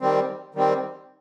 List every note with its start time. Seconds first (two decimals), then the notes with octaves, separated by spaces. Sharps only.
0.01 D#3 G3 C4
0.55 D#3 G3 C4